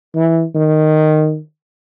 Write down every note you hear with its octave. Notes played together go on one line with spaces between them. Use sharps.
E3
D#3